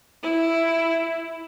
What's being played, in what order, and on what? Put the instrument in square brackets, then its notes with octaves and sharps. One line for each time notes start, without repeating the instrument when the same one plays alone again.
[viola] E4